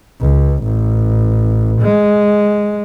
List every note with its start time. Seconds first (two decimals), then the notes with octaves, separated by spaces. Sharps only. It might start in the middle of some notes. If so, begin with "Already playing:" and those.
0.20 C#2
0.64 A1
1.82 G#3